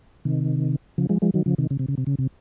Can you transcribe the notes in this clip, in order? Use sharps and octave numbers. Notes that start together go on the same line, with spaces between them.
C3 D#3
C#3 F3
F3 G#3
F3 G#3
D#3 F#3
C#3 F3
C3 D#3
C#3
C3
C#3
C3
C#3
C3